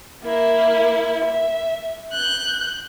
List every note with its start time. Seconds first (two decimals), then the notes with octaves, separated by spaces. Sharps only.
0.23 A#3 E4
1.25 E5
2.13 F#6 G6